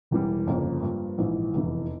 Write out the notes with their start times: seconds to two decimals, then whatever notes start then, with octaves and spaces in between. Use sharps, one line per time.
0.11 E1 E2 E3 G3
0.47 G1 F2 C#3 F3 A#3
0.82 G2 F3 A#3
1.18 A#1 G#2 E3
1.54 F1 E2 E3